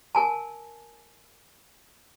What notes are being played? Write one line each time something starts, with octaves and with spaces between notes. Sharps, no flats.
A#4 G#5 A5